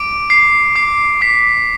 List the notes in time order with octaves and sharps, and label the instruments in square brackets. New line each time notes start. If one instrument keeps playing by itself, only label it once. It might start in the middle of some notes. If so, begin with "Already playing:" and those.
Already playing: [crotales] D6 D7
D6 C7
D6 C7
D6 B6